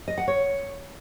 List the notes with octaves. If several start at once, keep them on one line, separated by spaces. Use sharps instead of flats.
D#5
F#5
C#5